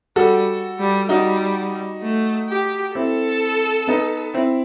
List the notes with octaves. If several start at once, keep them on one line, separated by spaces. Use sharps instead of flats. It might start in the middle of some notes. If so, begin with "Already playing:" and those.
G3 F#4 A4
G3
G3 D#4 F#4
A3
G4
C4 E4 A4
B3 D#4
C4 E4